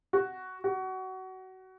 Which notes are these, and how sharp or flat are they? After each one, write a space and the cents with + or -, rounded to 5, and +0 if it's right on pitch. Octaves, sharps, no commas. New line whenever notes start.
F#4 +10
F#4 +25